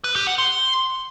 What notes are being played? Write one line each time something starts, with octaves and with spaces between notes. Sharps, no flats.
B4
G4
F#5
C6